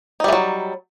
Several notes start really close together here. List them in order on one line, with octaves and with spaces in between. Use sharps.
D#4 G3 E3 F#3